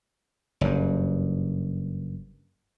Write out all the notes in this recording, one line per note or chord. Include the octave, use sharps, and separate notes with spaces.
F#1 G2